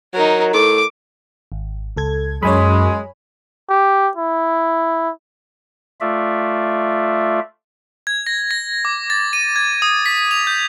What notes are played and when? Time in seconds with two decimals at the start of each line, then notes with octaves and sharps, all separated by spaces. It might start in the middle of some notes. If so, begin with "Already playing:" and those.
0.14 F#3 D#4 A#4
0.53 A2 D6
1.52 G#1
1.97 C#2 A4 G#6
2.43 F#2 G#3 C#5 G#5 B5
3.70 G4
4.17 E4
6.01 A3 F4 D5 E5
8.07 G#6
8.27 A#6
8.51 A#6
8.85 D6
9.10 A6
9.33 D#7
9.56 G#6
9.82 D#6
10.06 B6
10.31 F7
10.47 G6